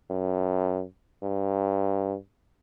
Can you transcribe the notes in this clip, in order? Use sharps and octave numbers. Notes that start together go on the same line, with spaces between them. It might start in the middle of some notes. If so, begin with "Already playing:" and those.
F#2
G2